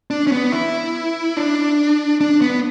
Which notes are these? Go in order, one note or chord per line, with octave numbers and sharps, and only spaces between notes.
D4
C#4
B3
E4
D4
D4
B3